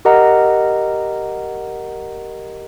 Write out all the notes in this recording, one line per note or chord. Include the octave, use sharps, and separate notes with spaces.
G4 A#4 D#5 F#5 A#5